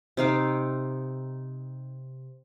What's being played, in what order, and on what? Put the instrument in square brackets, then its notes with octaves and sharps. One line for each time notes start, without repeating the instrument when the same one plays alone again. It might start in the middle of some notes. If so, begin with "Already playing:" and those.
[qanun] C3 D#4 F5 D6